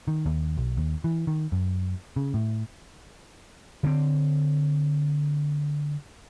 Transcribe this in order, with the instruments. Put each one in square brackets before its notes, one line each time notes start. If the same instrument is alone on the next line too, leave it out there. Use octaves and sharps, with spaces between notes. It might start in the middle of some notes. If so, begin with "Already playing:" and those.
[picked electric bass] D#3
D#2
B1
D#2
E3
D#3
F#2
C#3
A2
[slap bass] D3 C4